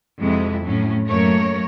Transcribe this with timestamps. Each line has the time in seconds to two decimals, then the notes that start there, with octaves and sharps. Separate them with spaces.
0.22 F2 C3 G#3 E4
0.65 A2 F#3 C#4
1.06 F#2 A3 A#3 A#4 C#5